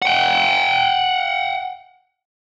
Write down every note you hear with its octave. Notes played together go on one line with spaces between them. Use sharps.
F#5 G5